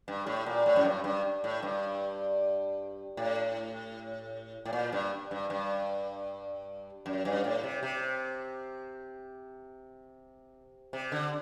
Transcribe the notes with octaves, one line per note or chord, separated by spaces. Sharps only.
G2
A2
A#2
A2
F#2
G2
G2
A2
G2
A2
A2
A#2
G2
G2
G2
F#2
G2
A2
C3
C3
C3
D3